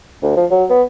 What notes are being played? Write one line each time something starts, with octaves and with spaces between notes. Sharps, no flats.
D2
F3
F#3
B3